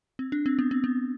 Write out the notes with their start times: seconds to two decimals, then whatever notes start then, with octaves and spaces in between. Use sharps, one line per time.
0.19 C4
0.32 D4
0.46 C4
0.59 B3
0.71 C4
0.84 B3